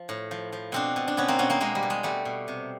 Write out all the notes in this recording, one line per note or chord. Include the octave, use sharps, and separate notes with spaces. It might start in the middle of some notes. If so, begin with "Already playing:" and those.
Already playing: F3
A2
F3
F3
B2 C4 D4
B2
D4
B2 B3 C#4
A#3 C4
B2 B3 C#4
A#3 C4
B2 G#3 A#3
G3
B2
G#3
B2 G3 A3
B2
C3